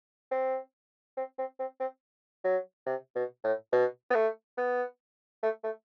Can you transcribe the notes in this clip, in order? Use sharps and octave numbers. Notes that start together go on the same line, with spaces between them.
C4
C4
C4
C4
C4
F#3
C3
B2
A2
B2
B3
A3
B3
A3
A3